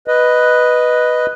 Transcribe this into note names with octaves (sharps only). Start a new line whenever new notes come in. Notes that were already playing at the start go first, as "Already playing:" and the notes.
B4 D#5